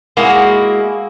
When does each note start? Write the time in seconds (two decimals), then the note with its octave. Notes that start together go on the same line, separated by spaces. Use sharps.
0.17 G#3 A#3 E4 F#4